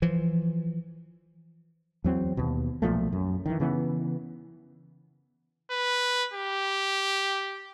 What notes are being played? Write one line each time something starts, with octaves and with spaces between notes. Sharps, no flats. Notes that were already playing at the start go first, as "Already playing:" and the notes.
E3 F3
E2 F#3 C4
D#2 B2
B1 A#2 F3 A3
F#2
D#3 E3
C#3 E3 B3
B4
G4